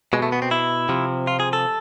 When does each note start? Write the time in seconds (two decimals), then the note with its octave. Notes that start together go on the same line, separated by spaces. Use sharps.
0.13 B2 G#3
0.22 A3
0.32 B3
0.42 C4
0.51 E4
0.89 C3 F3
1.27 F4
1.40 G#4
1.53 A4